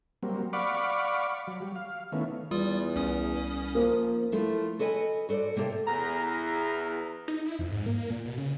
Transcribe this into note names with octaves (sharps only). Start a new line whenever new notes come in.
F#3 G3 A#3 C4
D5 F5 F#5 B5 C#6 D6
F#3
G3
F5
D#3 A3 B3 C#4 E4
E2 G3 F4 D#6
C2 C#4 D#6
F3 A#3
F3 A3 E4 F4 A4
F#4 A4 B4 D#5 G#5
F#4 A4 B4 C5 D5
C3 A#3 G4 A4 E5
E2 A#5
D#4
E4
F2
G#2
A#3
A#2
B2
C#3